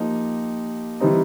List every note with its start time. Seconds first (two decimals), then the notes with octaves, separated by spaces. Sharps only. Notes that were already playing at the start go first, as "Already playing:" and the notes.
Already playing: F3 A#3 D#4 G4
1.00 E3 G3 C4 D#4